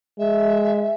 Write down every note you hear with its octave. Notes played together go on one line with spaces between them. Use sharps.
G#3 E5